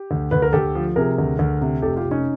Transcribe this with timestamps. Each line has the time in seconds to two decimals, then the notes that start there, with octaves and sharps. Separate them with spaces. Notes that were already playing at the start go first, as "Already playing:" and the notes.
Already playing: G4
0.11 D2
0.31 D2 B4
0.42 A#4
0.53 D2 G4 A4
0.75 F3
0.96 C3 G#4 A#4
1.18 D2
1.39 D2
1.62 C3
1.82 F1 G4 A4
1.96 F4 G4
2.04 F1
2.11 C#4 D#4